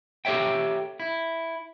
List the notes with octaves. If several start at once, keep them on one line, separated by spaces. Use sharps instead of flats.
G4 A4 C#5 E5 G5
E4